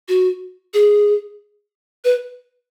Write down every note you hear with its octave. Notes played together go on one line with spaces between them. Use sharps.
F#4
G#4
B4